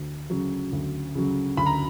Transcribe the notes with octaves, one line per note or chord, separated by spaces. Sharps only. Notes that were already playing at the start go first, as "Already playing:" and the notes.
Already playing: D2
C#3 F#3
D2
C#3 F#3
D2 B5
A#5